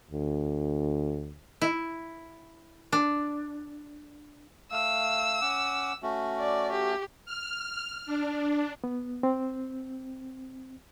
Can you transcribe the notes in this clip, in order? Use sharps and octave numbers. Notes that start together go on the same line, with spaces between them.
D2
E4
D4
A3 F5 E6
C#4 F#5 D6
A3 C#4 F#4
D5
G4
F6
D4
B3
C4